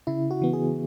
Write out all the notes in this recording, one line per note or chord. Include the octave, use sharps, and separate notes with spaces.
C#3 E4
F#4
E3 B3
G#4